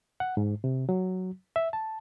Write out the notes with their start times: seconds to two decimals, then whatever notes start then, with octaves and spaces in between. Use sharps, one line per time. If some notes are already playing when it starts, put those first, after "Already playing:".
0.20 F#5
0.37 G#2
0.64 C3
0.89 F#3
1.56 E5
1.73 A5